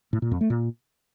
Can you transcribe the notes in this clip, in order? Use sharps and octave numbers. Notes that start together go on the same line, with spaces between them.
A2
A#2
F2
A3
A#2